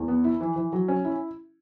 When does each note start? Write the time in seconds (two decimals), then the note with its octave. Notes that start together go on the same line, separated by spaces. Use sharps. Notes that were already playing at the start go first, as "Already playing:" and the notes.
Already playing: E2
0.08 B3
0.24 E4
0.41 E3
0.56 E3
0.73 F#3
0.88 C#4
1.04 E4